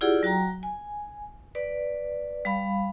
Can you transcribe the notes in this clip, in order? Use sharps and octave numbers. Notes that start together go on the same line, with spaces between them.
E4 F4 G4 G#4 D5 F#5
F#3 F#4 G5 A#5
G#5
B4 D5
G3 F5 B5